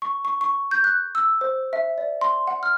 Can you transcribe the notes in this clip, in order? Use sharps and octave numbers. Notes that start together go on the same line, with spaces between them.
C#6
C#6
C#6
G6
F#6
E6
C5
E5
D5
C6
F#5
F6